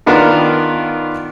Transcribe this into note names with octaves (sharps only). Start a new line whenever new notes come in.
D#3 B3 D4 F4 A#4